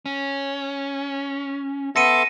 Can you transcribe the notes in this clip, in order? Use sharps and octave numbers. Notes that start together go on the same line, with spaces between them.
C#4
B3 A4 E5 C6 A#6 C#7 D#7